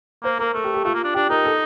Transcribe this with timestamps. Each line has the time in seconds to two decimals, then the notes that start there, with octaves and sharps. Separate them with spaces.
0.23 A#3 C5
0.39 A#3 A#4
0.54 A3 A4
0.64 G4
0.74 G4
0.84 A3 F4
0.94 A#3
1.04 D4
1.14 D4 G4
1.30 D#4 A#4
1.45 A4